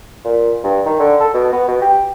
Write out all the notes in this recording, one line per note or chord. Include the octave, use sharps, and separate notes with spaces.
A#2
G2
D#3
D3
A4
B2
B3
B2
G4